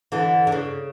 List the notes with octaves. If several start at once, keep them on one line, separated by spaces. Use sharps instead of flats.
D3 E3
D3
C#3